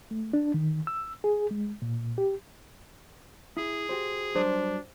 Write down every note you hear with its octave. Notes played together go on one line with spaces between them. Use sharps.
A3
D4
D#3
E6
G#4
G#3
A#2
G4
E4 G#4
F#4 G4 C5
G2 F#3 D4 C5